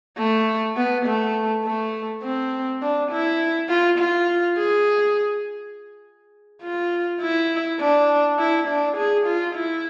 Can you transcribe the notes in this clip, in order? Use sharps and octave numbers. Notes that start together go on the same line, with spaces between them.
A3
B3
A3
A3
C4
D4
E4
F4
F4
G#4
F4
E4
D4
E4
D4
G#4
F4
E4